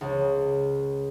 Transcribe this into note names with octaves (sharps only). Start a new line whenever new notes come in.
C#2